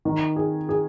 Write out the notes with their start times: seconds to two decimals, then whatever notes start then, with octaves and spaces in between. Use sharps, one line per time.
0.05 D#3
0.36 G#4
0.69 G#4